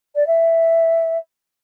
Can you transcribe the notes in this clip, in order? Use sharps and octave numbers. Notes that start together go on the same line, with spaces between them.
D5
E5